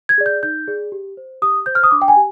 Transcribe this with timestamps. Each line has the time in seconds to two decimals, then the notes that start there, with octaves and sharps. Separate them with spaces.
0.09 G#6
0.18 G#4 D5
0.26 G6
0.43 D#4 G6
0.68 G#4 D5
0.92 G4
1.17 C5
1.42 G4 D#6
1.66 C5 G6
1.75 F6
1.84 D#6
1.91 D4 D6
2.02 G5
2.08 G#5
2.16 G4